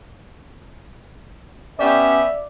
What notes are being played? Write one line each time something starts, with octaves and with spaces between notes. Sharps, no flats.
B3 C#4 G4 D5 E5